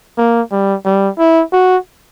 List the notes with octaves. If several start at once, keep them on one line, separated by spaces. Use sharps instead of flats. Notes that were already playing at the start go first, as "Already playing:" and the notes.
A#3
G3
G3
E4
F#4